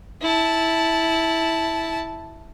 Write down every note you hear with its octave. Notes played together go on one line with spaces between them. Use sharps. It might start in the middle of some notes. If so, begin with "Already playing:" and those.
E4 A5